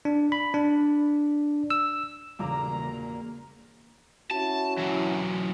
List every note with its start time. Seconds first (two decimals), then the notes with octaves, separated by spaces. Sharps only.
0.05 D4
0.32 B5
0.54 D4
1.70 E6
2.39 E1 A#2 C#3 E3 G3 A#3 A#5 D6
4.31 C#4 E4 F#4 A5
4.78 E3 F#3